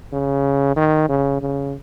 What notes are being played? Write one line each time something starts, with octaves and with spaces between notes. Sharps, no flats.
C#3
D#3
C#3
C#3